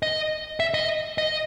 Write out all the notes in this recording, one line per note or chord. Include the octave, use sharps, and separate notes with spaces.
D#5
E5
D#5
D#5